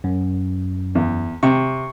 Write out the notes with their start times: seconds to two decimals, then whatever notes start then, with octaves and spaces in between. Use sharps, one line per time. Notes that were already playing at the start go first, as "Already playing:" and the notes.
0.04 F#2
0.95 E2
1.43 C3 C#6